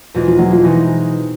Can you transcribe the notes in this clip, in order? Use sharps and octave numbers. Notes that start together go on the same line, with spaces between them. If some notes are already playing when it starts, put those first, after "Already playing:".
E2 B2 F3 G#3 C4 D#4
F3
F#3
F3
B2 E3 G#3 C4 D#4